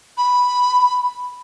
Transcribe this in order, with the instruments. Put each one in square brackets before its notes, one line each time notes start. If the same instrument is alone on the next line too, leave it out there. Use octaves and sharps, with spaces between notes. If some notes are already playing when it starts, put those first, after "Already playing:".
[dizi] B5